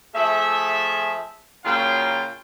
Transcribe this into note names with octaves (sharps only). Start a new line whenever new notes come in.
F3 A3 G#4 E5
A#2 C#3 F#3 F4 F5 G5